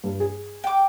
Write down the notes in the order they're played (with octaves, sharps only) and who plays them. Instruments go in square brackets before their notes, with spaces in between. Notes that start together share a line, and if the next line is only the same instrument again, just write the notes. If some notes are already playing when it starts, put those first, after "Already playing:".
[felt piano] G2
G#4
[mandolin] G5 D6